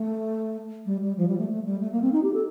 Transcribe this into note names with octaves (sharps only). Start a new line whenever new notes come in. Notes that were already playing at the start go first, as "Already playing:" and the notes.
Already playing: A3
G3
G3
F3
G3
A3
A3
G3
A3
A#3
C4
D#4
G4
A4